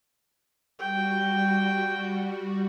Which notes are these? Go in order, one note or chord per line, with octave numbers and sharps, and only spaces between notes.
G3 F#4 G5